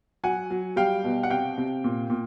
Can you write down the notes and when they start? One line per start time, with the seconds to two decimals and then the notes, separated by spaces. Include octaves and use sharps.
0.23 F#3 F#5 G#5
0.50 F#3
0.76 G3 F5 G5
1.04 B2
1.23 F#5
1.30 C3 F5 G5
1.58 C3
1.84 A#2
2.10 A#2